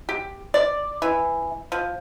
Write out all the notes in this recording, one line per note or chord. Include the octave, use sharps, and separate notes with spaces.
G4
D5
E3
F3